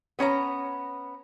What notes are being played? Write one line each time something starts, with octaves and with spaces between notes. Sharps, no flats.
B3 C#4 A5 A#5